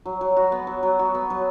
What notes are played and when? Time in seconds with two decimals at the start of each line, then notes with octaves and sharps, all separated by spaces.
0.05 F#3
0.21 F#3
0.37 F#4
0.52 B3
0.67 F#3
0.83 F#3
0.99 F#4
1.15 B3
1.30 F#3